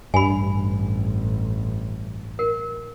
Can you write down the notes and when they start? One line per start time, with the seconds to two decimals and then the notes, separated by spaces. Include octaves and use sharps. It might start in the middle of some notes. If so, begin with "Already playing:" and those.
0.14 A1 G2 G#5 B5
2.39 A#4